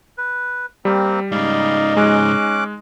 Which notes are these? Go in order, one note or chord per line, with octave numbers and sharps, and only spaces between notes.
B4
G3 A#3 C4
G#2 C#3 D#4 D5 F5
G#3 C#4 D6 F#6